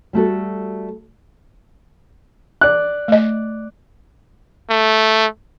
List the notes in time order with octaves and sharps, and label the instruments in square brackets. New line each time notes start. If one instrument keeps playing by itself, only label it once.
[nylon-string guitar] G3 A3 F#4 A4
[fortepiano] D5 F#6
[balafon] A3 D#5
[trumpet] A3